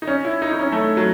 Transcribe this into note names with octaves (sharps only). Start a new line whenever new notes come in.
D#4
C#4
E4
D#4
D#4
C#4
A3
F#3